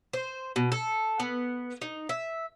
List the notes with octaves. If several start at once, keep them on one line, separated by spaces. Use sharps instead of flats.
C5
B2
A4
B3
D#4
E5